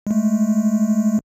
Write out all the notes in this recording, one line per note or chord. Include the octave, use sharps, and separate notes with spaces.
G#3 A3